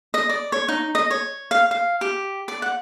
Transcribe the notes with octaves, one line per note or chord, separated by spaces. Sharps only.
D#5
D5
C#5
D#4
D#5
C#5
F5
F5
G4
D5
F#5